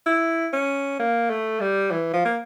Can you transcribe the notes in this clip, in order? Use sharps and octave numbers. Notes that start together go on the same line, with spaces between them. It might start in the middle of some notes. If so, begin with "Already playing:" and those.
E4
C#4
A#3
A3
G3
E3
F3
A#3